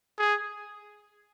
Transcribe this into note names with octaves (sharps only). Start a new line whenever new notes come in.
G#4